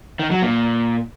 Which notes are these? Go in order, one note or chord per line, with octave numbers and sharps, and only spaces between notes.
D#3
F#3
A#2